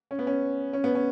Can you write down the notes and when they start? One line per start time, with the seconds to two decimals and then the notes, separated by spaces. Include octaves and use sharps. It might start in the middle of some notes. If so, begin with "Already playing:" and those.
0.11 C#4
0.19 B3
0.27 C#4
0.73 C#4
0.84 B3
0.95 C#4